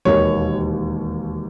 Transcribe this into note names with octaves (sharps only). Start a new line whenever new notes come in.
E1 D#2 D#3 A#3 C#5